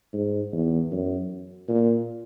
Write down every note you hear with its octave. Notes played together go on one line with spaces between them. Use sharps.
G#2
E2
F#2
A#2